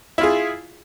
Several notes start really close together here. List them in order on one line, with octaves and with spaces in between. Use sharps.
E4 F4 G#4